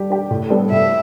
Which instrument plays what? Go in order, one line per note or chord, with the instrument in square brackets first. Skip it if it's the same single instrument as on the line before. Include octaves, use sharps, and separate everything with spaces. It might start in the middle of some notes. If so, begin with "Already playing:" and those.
Already playing: [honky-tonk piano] G3 D4 G4
D4 G4
A2
G3 B3 D4 A4
[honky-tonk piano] A2 [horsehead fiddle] E5